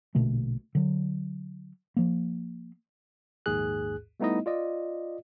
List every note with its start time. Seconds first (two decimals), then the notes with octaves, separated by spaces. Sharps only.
0.15 A#1 B2 D3 A3
0.75 D3 F#3
1.97 F3 A#3
3.46 A#1 D#2 G#2 G#4 F#6
4.20 G3 A3 B3 D#4 E4 D#5
4.46 F4 D5 D#5